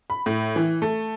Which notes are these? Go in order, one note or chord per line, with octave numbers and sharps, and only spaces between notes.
B5
A2
E3
A3